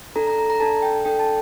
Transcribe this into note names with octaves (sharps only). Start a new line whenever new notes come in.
D4 A4 A#5
A#5
A#5
A#5
D4 A4 A5
G5
D4 A4 G5
A5